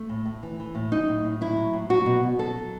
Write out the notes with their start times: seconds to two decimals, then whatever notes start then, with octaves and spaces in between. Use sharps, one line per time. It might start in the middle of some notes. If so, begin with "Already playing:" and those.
Already playing: A3
0.09 A2
0.25 A2
0.43 E3
0.59 E3
0.75 A2
0.92 F#3 D#4
1.08 A2
1.24 A2
1.41 F#3 E4
1.57 F#3
1.73 A2
1.90 F#3 F#4
2.06 B2
2.23 B2
2.39 F#3 A4
2.56 F#3